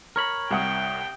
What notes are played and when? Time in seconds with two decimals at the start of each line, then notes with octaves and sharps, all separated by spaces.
0.16 A#4 C#5 B5
0.51 C2 F#5 G5 D#6